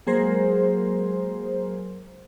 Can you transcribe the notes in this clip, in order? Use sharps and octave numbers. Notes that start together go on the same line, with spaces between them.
F#3 G#3 A#3 G#4 A#4 C5